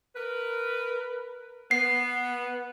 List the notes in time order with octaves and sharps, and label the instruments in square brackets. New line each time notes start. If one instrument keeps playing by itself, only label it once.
[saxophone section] A#4 B4
[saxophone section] B3 [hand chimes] C7